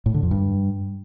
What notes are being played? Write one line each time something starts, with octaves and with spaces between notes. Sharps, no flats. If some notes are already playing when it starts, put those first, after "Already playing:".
A2
D3
F2
G2